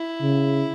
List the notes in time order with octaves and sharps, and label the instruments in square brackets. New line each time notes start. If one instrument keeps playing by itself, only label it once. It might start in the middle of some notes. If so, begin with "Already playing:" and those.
Already playing: [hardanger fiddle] E4
[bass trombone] C#3